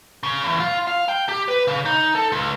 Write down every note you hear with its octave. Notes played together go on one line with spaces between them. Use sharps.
C#3
E2
F4
F5
G5
G4
B4
C#3
D#4
A4
C#2